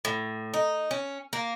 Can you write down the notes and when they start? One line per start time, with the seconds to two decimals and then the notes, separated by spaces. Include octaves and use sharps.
0.05 A2
0.54 D#4
0.91 C#4
1.33 A#3